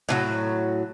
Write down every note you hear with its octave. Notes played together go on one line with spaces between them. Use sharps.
A2 D#3 F#3